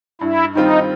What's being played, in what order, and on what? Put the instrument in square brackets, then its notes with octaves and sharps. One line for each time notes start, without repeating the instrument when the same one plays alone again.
[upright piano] G2 [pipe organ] E4
[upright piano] D#3 G3 C4 F4 [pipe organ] D#4